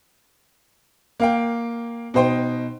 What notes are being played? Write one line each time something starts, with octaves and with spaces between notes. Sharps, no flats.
A#3 F5 G5
B2 D#4 C5 G5